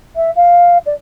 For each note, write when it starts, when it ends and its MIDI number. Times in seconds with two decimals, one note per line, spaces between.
0.16 0.31 76
0.36 0.78 77
0.86 0.94 74